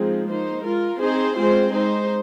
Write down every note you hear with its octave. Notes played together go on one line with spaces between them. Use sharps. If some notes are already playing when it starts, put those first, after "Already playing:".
Already playing: F3 G#3 C4 D#4 G#4
A#3 D#4 C5
G#3 F4 A#4
C4 D#4 G#4 C5
G#3 C4 F4 G#4 C5
G#3 D#4 C5